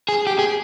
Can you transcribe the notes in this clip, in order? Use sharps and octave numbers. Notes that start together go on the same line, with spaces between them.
G#4
G4
G#4